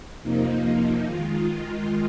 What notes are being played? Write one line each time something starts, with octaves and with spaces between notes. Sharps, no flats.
F2 C3 F3 A#3 D#4
D#3 G#3 F4